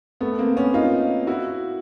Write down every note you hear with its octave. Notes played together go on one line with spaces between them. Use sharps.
A3 B3
A#3 C4
B3 C#4
D#4 F4
E4 F#4